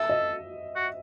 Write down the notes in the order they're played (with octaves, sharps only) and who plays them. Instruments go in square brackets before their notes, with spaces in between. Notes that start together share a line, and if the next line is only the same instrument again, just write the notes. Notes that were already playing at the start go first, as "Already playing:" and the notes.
Already playing: [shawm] A4 [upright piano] E5
[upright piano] D#5
[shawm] F#4